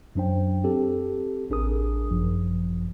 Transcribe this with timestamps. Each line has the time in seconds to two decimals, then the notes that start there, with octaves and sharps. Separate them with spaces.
0.15 F#2 F#3 D4 C5 G5
0.64 C4 G4 A4
1.50 A1 D4 G#4 A#4 D#6
2.10 G#1 F#2 F3